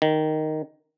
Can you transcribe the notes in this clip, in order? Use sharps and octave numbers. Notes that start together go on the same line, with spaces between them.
D#3